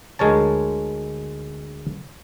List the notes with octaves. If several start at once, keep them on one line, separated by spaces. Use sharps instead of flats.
D2 G#3 A#4 C#5 A5